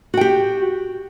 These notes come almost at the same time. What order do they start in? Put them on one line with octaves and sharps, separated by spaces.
F#4 G5 G4